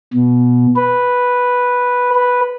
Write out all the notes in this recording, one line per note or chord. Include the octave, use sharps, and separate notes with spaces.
B2
B4
B4